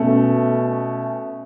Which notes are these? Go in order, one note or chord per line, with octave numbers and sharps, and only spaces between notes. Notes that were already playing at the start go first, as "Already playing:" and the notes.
Already playing: B2 A3 C#4